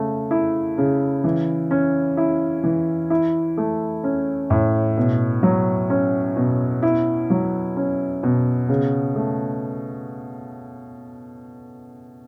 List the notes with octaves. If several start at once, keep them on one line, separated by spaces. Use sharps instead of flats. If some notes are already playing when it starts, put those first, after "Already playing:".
Already playing: C#3 A3
E4
C#3
E3
C#4
E4
E3
E4
A3
C#4
A2
B2
F#3
C#4
B2
E4
F#3
C#4
B2
C#3
A3